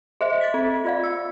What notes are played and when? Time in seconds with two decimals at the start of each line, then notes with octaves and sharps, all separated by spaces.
0.21 G#4 C5 D#5 E5
0.41 A6 B6
0.54 C4
0.84 F4 D5 F5
1.04 E6